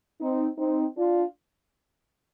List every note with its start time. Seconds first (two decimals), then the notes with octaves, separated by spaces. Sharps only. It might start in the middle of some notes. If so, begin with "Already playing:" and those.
0.21 C4 D#4
0.58 C4 D#4
0.96 D4 F4